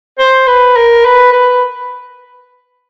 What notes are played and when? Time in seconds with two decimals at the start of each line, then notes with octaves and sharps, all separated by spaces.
0.19 C5
0.48 B4
0.77 A#4
1.05 B4
1.33 B4